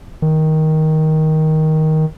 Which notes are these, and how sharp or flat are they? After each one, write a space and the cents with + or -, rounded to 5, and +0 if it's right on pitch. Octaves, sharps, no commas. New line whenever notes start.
D#3 +10